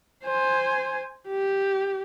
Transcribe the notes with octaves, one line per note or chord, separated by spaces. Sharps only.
C5 G#5
G4